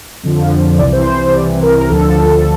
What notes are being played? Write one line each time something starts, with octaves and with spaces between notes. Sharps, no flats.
F2 D3 F3
C2 C3 E3 D5
C5
C5
C5
C2 C3 E3 D5
A#4
A#4
D2 D3 F3 A4